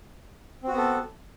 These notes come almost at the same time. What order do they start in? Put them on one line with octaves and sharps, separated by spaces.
C4 F#4 B3 A4